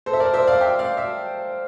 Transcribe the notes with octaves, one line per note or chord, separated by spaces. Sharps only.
A4 C5
E5
A#4 D5
C5 E5
D5 F5
E5 G5
D5 F5
E5